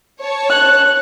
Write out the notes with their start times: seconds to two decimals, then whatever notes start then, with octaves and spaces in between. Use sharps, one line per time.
0.20 C#5 A5
0.50 F#6